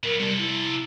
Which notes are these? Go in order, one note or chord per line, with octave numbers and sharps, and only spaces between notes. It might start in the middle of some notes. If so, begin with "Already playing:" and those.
B2 F#3 A#4
C3 G3 A4
E4